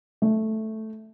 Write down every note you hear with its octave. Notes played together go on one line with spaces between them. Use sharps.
A3